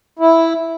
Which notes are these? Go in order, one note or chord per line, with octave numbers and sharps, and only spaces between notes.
E4